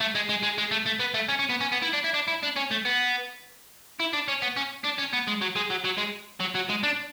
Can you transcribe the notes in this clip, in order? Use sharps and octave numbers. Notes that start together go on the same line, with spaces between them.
A3
G#3
G#3
G#3
G#3
A3
A3
B3
A3
C#4
C#4
B3
C#4
B3
E4
D4
E4
D4
E4
D4
C#4
A3
B3
E4
D4
C#4
B3
C#4
D4
C#4
B3
G#3
F#3
G#3
F#3
F#3
G#3
F#3
F#3
G#3
D4